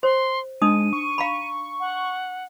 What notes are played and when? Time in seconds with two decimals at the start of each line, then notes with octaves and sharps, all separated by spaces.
0.03 C5 C6
0.62 G#3 D4 D#4 D#6 D#7
0.93 C#6
1.18 F5 A#5 B5
1.80 F#5